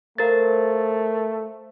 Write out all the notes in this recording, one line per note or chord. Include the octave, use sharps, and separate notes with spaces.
A3 A#4 C5 F5 A6